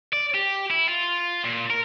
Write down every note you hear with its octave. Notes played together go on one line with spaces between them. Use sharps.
D5
G4
E4
F4
A#2
A#4